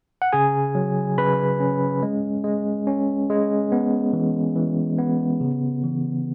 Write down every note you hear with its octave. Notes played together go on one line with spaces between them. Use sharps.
F#5
C#3 G#4 G#5
F#3
C#3 B4 B5
C#4
G#3
G#3
C#4
G#3
B3
E3
E3
B3
C#3
E3